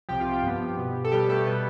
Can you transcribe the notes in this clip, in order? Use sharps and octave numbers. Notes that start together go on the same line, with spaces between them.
C2 C3 F3 G4 G5
F4 F5
G4
G2 F3 B3
B2 B3
A4
B2 G3 B3 G4
A3 A4
B2 G3 B3